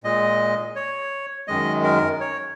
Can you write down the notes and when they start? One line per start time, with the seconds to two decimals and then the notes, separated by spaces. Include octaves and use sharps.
0.04 A#2 G#3 D#5
0.76 C#5
1.48 F#2 D#3 G#3 D#5
1.84 A#4
2.20 C#5